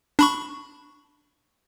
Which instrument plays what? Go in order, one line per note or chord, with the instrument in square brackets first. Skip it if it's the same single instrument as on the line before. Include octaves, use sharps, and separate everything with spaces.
[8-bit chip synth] D4 B5 C#6